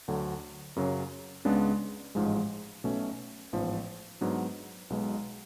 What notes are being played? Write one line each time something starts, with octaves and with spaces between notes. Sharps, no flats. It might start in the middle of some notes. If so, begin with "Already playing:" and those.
D2 D3 F#3
F#2 C#3 F#3
C#2 C#3 G#3 B3 D4
A1 G#2 F3 G#3
B1 B2 A3 C#4
A1 G#2 F3 B3
G#2 F#3 B3 D4
B1 B2 G#3